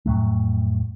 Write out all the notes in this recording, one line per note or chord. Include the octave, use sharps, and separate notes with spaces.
F2 A2 F#3 A3